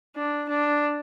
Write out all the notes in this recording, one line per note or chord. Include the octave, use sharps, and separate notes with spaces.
D4
D4